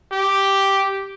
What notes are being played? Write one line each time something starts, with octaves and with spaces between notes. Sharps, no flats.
G4